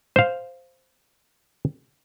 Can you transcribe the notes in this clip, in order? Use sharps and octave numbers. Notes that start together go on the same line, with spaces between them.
C5 F5